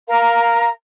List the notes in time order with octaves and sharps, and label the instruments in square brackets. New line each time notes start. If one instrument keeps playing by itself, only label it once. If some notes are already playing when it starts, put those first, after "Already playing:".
[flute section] A#4 F5 A#5